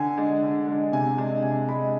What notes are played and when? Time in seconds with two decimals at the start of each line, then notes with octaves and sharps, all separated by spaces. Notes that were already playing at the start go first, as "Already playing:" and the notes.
Already playing: D3 G#5
0.17 G#3 D4
0.43 D3
0.67 G#3 D4
0.92 C3 G#5
1.18 G#3 D4
1.43 C3 G#5
1.68 G#3 D4 B5